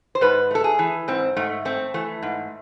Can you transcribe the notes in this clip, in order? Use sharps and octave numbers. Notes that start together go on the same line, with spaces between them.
C5
G#2 B4
A3 A4
G#4
E3
G#2 C4
G#2 A3
A3 C4
E3 A3
G#2